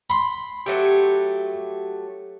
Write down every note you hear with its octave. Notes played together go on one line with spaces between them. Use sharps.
B5 C6
F#3 A3 G4